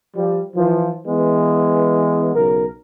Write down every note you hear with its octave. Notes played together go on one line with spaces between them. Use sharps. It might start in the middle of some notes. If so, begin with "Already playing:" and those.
F3 G3
E3 F3
E3 G#3 B3
B1 C#3 A#4